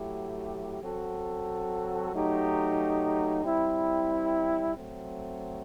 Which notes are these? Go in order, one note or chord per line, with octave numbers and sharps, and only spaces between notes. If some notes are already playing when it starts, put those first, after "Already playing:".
Already playing: F#3 A3 E4 G4
F#3 C4 F#4 A4
F#3 A3 D#4 G4
G3 C4 E4
F#3 A3 C4